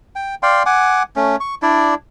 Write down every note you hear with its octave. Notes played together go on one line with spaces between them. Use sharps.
G5
D5 F5 G5 C6
F#5 G#5 D6
A3 C#4
C#6
D4 E4 D5